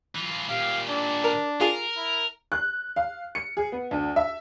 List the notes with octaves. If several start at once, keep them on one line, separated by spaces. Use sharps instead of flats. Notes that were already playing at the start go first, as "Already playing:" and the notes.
E3 F4
A#2 G4 F5
D4
A#4
F4 G#4 A#4
E4
F#6
F5
C#7
G#4
B3
D2
E5